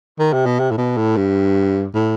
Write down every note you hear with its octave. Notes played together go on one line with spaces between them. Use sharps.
D#3
C3
B2
C3
A2
B2
A2
G2
A2